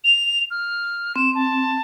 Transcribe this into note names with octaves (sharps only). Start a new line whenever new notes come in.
F7
F6
C4 E7
A5